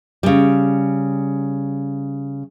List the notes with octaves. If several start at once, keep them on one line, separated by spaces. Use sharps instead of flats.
C#3 G3